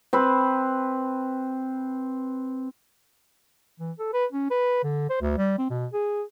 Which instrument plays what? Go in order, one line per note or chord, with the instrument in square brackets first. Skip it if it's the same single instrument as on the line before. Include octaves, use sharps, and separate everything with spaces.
[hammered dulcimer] C4 B4
[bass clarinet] E3
A4
B4
C#4
B4
D3
C5
D2
G3
C4
B2
G#4